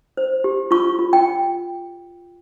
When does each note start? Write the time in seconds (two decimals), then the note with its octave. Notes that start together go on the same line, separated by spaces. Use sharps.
0.17 C5
0.44 G4
0.71 F4 C#6
0.99 F4
1.13 G5